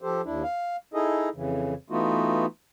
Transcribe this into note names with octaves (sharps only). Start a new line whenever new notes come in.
F3 G4 A4 C5
D#2 D4 E4
F5
D#4 E4 G#4 A4 D#5
F2 C#3 E3
E3 A3 B3 D#4 F4 F#4